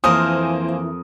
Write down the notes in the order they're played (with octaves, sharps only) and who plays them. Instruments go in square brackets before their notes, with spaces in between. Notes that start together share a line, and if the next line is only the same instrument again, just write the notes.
[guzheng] F2 A#4 [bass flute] E3 [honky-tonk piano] A#3 C5 G#5 [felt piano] D#6